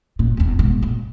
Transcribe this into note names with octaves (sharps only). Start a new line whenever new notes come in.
A#2
E2 C4
G#2 B2
A#2